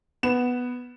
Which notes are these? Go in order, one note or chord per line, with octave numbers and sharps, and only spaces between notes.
B3 E7